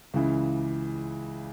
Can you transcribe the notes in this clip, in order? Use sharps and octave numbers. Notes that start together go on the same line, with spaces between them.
C#2 C#3 E3